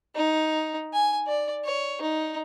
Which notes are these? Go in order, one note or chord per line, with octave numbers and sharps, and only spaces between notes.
D#4
G#5
D5
C#5
D#4